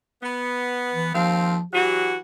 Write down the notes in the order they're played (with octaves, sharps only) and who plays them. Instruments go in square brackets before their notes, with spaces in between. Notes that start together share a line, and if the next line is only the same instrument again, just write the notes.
[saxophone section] B3
[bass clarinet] E3
[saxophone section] D#2 C4 F5 [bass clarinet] F3
[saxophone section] E3 F#3 F#4 [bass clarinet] G4